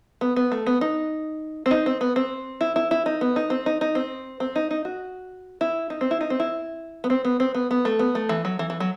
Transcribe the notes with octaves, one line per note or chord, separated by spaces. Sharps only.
B3
B3
A3
B3
D#4
C4
D#4
C4
B3
C4
E4
E4
E4
D#4
B3
D#4
C4
D#4
D#4
C4
C4
D#4
D#4
F#4
E4
D#4
C4
E4
D#4
C4
E4
B3
C4
B3
C4
B3
B3
A3
B3
A3
E3
F#3
E3
E3
F#3